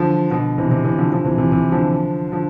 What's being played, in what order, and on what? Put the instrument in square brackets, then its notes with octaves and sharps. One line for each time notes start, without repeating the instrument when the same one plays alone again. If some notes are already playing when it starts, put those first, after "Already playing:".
Already playing: [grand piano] D3 E3 F3
B2 D3
C3 E3
C3 E3
C3 E3
D3 F3
D3 F3
C3 E3
C3 E3
C3 E3
D3 F3
D3 F3